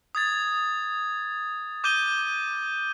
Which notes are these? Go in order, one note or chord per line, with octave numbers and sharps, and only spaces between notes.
D#6 G#6 A6
D6 G6 D#7 G7